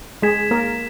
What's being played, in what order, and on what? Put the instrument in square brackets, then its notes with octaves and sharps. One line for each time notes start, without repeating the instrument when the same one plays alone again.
[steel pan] G#3 G#4 [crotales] G#6 B6 E7
[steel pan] A#3 A#4